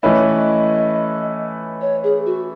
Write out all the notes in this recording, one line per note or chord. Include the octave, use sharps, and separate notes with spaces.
E3 A3 C#4 E4 B4 D#5
C#5
G#4
F#4